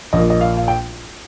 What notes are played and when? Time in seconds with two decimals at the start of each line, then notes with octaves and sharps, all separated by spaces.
0.13 A#1 A#2 D#5
0.30 D#5
0.41 F5
0.57 F5
0.68 G5